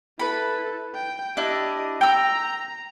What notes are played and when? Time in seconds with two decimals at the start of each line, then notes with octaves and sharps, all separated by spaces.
0.19 E4 A4 B4 B5
0.95 G5
1.37 D4 E4 G4 D#5
2.01 G5 A#5 E6